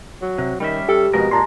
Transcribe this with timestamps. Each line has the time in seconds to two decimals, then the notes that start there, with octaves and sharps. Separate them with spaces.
0.22 F#3
0.38 C3
0.60 D#3 G3 C#4 E5
0.89 G4 A4
1.13 F2 B2 G#3 A#4
1.31 A#2 G#3 A5 A#5 C6